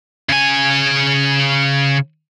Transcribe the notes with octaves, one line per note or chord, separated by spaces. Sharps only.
C#3 G#5